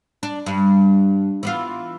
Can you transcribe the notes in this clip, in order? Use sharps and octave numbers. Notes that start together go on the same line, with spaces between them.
D4
G2
E3 B3 F4